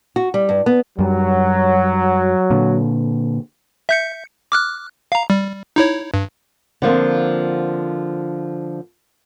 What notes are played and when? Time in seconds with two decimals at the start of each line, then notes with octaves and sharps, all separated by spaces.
0.16 F#4
0.34 G3
0.49 G2
0.66 B3
0.99 F#2 F#3 G3
2.50 A#2 D3
3.89 E5 G6 C#7
4.52 D6 F6 F#6
5.12 F5 A#5
5.30 G3
5.76 D#4 E4 C#5
6.14 G2
6.82 D3 F3 A#3 C4